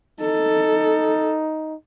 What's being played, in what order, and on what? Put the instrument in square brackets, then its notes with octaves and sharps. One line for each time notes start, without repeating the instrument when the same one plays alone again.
[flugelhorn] D#4 [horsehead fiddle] A4